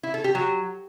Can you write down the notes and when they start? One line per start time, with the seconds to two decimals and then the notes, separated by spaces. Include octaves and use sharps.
0.03 E4
0.14 A4
0.24 G4
0.35 F#3